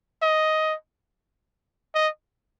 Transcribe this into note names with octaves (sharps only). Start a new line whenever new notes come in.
D#5
D#5